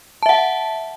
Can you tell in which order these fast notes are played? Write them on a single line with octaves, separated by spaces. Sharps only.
A5 E5 F#5